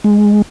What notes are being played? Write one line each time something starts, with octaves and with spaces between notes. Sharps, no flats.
G#3